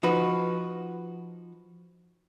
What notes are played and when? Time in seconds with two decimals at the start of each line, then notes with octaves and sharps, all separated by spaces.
0.03 F3 D#4 F#4 B4